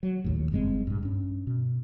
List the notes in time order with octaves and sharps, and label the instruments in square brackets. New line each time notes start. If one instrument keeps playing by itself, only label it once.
[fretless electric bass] F#3
A#1 D#2 A2
F#1 G2 G#3 C4
A#1 G2
G2 C#4
B2